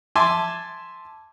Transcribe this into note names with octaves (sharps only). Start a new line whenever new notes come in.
E5 G#5 A5 C6 D6